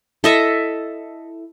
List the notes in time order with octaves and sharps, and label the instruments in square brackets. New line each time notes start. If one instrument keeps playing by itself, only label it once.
[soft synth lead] E4 [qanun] A4 D#5 E5